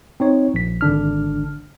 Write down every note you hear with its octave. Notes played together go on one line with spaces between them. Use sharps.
C4 D#4 C#5
A#1 B6
G#1 D3 D4 F6